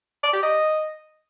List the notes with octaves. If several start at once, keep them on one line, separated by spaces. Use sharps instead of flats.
D5
G4
D#5